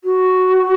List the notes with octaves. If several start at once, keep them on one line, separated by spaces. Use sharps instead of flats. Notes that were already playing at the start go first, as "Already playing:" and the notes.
F#4